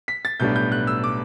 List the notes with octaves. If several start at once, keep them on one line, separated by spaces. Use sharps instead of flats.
B6
A6
B1 A2 G3 B3 D4 G6
G6
F#6
E6
D6